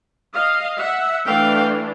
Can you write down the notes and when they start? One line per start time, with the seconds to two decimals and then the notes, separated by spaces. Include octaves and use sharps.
0.34 D#5 F5
0.79 E5 F#5
1.26 E3 A3 D4 F5 G5